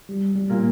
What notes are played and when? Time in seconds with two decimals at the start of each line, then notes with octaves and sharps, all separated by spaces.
0.09 G3
0.36 G3
0.50 A#2 A#3